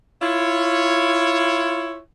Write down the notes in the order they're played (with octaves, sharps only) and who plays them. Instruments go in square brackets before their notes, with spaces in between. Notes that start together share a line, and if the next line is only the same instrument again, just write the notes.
[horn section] E4 F4 C#5